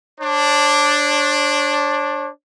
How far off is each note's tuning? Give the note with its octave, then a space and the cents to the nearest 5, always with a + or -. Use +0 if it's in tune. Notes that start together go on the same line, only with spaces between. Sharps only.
D4 +0 C#5 -40